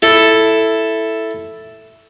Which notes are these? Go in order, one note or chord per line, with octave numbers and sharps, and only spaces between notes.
E4 A4